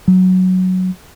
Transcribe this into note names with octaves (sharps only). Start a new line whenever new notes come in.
F#3